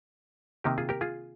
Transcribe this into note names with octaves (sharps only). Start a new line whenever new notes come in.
C3 D#3 A#3 D#4 G4
F4 G#4
G4 A#4
F4 G#4